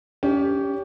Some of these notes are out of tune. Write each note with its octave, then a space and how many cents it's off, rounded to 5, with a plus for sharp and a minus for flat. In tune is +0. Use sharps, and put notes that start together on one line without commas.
C#4 +25 G4 +0